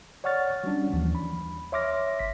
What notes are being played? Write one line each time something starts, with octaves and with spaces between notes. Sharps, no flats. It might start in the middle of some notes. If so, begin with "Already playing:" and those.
C#5 D5 F#5 C#6 F6 A6
F#3 G3 C#4 D4
D#2 E3 F3
B5
C#5 E5 C6 D6 F6 A#6
G1 B6